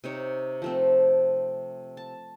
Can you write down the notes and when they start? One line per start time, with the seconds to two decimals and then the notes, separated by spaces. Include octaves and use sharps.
0.04 C3 D#4 C#5
0.62 F3 A3 C4
1.97 A5